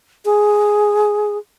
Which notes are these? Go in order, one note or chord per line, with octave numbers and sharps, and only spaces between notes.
G#4